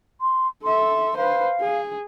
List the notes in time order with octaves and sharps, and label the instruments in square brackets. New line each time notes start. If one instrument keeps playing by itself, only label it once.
[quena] C6
[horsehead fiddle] A4 E5 [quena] C6
[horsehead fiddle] B4 C5 [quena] F5
[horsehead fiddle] G#4